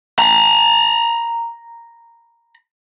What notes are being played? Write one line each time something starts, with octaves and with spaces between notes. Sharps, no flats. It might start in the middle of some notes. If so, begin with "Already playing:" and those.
A#5 B5